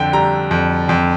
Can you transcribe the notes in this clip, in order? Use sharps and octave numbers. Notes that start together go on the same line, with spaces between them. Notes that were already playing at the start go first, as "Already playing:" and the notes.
Already playing: F2 D3 G5
G3 A#5
F2
F2